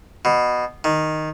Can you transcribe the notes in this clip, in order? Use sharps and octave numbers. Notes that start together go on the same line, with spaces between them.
B2
D#3